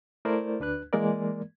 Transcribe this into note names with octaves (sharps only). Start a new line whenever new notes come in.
A3 E4 A#4 C5 D5
D2 D4 B4 F#6
E3 G#3 A#3 A#4 D5